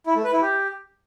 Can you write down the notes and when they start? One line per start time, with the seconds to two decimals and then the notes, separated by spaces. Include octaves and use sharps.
0.07 E4
0.15 A3
0.24 B4
0.33 E4
0.42 G4